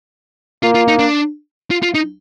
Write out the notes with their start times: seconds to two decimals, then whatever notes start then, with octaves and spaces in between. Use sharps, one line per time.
0.63 A#3 F4
0.75 F4
0.88 D#4
0.99 D4
1.71 F4
1.83 F4
1.94 D#4